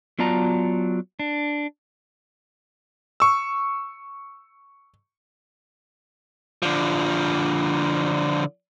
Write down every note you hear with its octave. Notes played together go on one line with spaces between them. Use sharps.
F#3 B3 F4 D5 A5 A#5
D4
C#6 E6
D3 F3